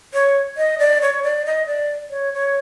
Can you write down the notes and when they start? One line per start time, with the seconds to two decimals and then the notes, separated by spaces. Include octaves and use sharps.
0.14 C#5
0.57 D#5
0.79 D5
1.02 C#5
1.23 D5
1.45 D#5
1.66 D5
2.10 C#5
2.34 C#5